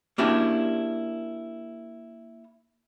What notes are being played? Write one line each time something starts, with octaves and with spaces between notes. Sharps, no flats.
A#3 C#4 D4 E4 F#4 G4